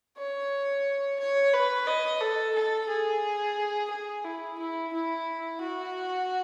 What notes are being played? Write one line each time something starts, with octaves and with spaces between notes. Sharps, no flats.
C#5
C#5
B4
D#5
A4
A4
G#4
G#4
E4
E4
E4
F#4